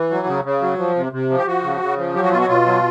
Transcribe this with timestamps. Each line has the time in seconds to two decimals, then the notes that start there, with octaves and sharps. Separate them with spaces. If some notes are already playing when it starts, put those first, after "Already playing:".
Already playing: E3
0.11 F#3
0.27 C#3
0.44 C#3
0.62 F#3
0.78 F3
0.96 C3
1.12 C3
1.30 F3
1.38 G4
1.47 F3 F#4
1.64 C#3
1.81 C#3
1.98 F3
2.15 F#3 G4
2.24 F#4
2.32 B2 F4
2.40 F#4
2.48 B2 F4
2.66 F#3